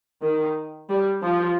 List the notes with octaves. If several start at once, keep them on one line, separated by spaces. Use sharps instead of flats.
D#3
G3
F3